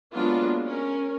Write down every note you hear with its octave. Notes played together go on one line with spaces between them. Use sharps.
F#3 G#3 A#3 B3 D4 F4
C#4 A#4